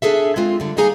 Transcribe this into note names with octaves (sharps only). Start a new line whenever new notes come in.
D4 G#4 A4 E5
G#3 C4 F4
D3 G3
G3 A#3 D#4 G#4 G#5 A#5